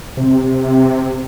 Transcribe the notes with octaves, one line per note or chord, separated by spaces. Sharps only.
C3